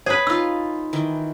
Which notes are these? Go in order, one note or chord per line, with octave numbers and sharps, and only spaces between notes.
G#4 B4 C#5
D#4 F4 E6
D#3 E3